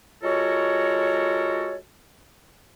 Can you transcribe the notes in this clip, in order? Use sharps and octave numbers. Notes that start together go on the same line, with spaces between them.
G#3 F4 F#4 A4 A#4 C#5